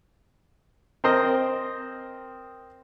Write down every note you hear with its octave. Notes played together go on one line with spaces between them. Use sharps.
C4 A#4 C5 D#5